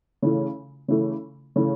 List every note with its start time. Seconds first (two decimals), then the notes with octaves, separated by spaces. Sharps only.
0.22 C#3 E3 A3
0.88 C#3 E3 A3
1.56 C#3 E3 A3